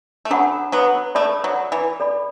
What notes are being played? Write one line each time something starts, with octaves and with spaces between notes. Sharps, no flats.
A3
F#3 D4 A4 F#5 B5
F#3 B3
A3 A4 D5 B5
F#3
E3
A4 D5 B5